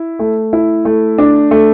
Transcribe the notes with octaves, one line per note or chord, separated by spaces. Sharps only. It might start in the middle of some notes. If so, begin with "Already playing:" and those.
Already playing: E4
A3
E4
A3
D4
A3